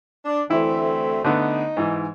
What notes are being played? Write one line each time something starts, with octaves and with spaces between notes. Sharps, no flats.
D4
D2 E3 A3 C4 E4
D3 A3 B3 D#4
G#2 E3